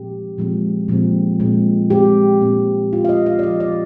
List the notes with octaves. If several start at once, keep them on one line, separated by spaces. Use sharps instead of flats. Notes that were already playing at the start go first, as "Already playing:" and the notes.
Already playing: A#2 F3 G#3 C4 G4
A#2 F3 G#3 C4
A#2 F3 G#3 C4
A#2 G#3 C4
A#2 G#3 C4 G4
A#2 G#3 C4
A#2 G#3 C4 F4
F5
D#5
F5
D5
F3 C4 D#4 D#5
D5